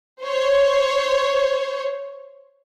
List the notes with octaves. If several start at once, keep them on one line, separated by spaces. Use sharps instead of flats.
C5 C#5